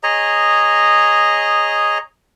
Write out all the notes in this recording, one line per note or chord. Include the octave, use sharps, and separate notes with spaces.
G#4 C#5 D#5 A#5